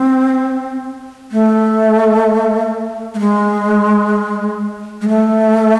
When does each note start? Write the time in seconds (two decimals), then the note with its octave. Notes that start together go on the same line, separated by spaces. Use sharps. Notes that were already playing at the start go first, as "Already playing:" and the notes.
Already playing: C4
1.32 A3
3.14 A3
3.19 G#3
5.01 G#3
5.08 A3